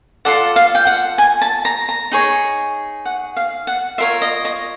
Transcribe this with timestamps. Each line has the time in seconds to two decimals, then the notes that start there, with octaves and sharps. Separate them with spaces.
0.25 F4 A4 D5 F#5
0.56 F5
0.75 G5
0.87 F#5
1.18 G#5
1.41 A5
1.65 A#5
1.89 A#5
2.12 D#4 G#4 C#5
3.05 F#5
3.37 F5
3.67 F#5
3.98 F4 A#4 C#5 E5
4.22 D#5
4.45 D#5